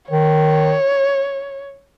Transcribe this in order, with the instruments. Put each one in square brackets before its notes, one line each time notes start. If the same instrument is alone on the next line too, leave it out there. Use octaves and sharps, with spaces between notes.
[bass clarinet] D#3 [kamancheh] C#5